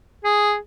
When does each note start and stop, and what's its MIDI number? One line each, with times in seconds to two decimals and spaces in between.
0.24 0.57 68